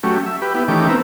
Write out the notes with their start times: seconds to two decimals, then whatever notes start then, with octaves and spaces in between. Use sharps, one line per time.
0.03 F#3 A3 C#4 G4
0.26 E5
0.42 G4 B4
0.55 B3 E4 G4
0.68 D#3 E3 A3 C#4 G4 D6
0.88 B3 C4 A#4 E5